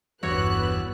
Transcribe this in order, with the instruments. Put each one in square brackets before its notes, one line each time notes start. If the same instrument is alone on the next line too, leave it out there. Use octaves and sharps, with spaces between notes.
[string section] G1 B3 F#6 [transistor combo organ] E2 G2 E6 [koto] F#4 C#5